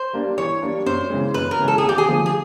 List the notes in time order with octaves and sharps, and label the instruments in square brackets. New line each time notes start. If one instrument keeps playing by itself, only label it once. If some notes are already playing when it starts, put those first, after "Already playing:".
Already playing: [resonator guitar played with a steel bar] C5
[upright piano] G3 A#3 D4
[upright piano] E3 [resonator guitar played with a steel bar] C#5
[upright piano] G3 A#3 D4
[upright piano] F#2 [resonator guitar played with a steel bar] C5
[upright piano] C#3 E3 G#3
[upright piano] F#2 [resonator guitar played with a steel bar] B4
[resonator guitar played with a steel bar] A#4
[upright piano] C#3 E3 G#3
[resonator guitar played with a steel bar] A4
G#4
[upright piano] D#2
[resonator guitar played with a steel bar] G4
G#4
[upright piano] D3 F3 A3
[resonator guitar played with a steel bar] G#4